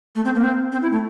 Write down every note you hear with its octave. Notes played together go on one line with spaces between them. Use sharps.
A3
C4
A#3
C4
C4
E4
A3